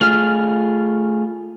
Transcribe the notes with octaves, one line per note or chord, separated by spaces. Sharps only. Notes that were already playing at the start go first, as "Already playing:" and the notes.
A3 F4 G#4 F6